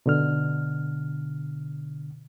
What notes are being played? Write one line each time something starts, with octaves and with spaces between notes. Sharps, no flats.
B2 D3 F6